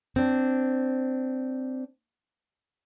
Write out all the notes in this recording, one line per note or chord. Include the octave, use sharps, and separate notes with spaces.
C4 D4